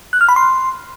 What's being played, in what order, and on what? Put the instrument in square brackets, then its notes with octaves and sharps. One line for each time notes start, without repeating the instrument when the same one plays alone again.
[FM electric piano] F#6
F6
B5
C6